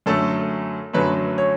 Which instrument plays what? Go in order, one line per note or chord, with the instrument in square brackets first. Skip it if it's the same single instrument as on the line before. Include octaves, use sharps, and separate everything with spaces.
[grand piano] F#2 D3 F#3 A3 A4
F#2 D3 F#3 A3 B4
C#5